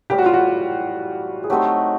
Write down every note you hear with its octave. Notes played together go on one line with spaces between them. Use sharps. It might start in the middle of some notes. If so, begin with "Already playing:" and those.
A2 E3 G3 G4
F#4
F4
F#4
G#4
F#3 A3 C4 D#4 G4